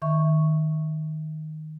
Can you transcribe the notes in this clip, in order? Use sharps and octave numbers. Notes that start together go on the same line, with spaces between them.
D#3 E5 C#6